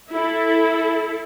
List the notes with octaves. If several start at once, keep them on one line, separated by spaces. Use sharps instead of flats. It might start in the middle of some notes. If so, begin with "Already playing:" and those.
E4 A4